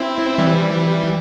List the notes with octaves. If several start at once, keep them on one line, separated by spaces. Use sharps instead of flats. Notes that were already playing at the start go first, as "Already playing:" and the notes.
Already playing: C4 E4
E3 G3